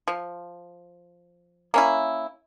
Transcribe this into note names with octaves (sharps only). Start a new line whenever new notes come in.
F3
A#3 C#4 E4